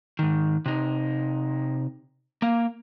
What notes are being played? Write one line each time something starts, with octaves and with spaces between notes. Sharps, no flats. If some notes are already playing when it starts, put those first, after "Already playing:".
G#2 D#3
C3 D#4
A#3 F5